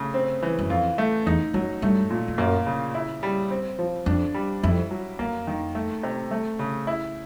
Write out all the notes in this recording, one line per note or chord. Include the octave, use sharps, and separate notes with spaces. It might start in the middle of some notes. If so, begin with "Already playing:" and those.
Already playing: C#3 A3
C4
E3
F#2
F2 F4
A3
E2 D#4
F#2 F#3
G2 A3
A#2
F2
F#2 A#3
C#3
E4
G3
C4
F3
F2 D4
G3
F2 E4
F#3
F2 A#3
D#3
A3
C3
A3
C#3
E4